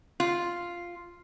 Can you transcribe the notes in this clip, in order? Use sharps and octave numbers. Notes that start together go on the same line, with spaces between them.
F4